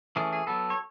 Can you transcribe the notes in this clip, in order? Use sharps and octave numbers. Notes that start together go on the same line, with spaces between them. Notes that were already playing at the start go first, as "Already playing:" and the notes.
E3 A3 C#4 G#4
G#4
F#3 B3 A4
C#5